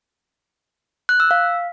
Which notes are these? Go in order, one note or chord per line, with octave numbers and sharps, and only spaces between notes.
F#6
E6
F5